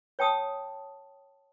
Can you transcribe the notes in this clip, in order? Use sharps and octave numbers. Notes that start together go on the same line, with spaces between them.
C#5 G5 A5 D#6